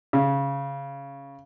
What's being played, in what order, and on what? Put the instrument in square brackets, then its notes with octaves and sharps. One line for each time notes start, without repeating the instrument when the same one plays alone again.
[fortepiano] C#3